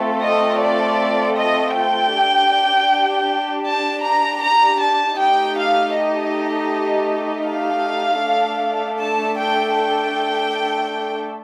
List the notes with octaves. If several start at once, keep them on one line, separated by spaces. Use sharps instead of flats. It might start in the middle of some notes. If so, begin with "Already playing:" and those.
Already playing: A3 C4 F4 A4
D#5
D5
D#5
G5
D4 G4
A5
A#5
A#5
A5
A3 D#4 G4 G5
F5
D#5
F5
A3 D4 A4
A5
G5
G5